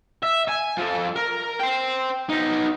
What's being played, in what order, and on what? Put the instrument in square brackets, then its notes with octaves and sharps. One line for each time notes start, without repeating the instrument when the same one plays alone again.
[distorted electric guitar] E5
G#5
F3 A4
A#4
C5 G5
B3 D#4